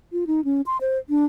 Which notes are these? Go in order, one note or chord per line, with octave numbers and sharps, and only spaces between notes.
F4
D#4
C#4
C6
C5
D4